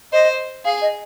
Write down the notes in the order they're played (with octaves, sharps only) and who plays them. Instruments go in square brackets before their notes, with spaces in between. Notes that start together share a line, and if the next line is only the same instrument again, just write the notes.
[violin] C5 [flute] D#5
[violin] G#4 [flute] F5
[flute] D#5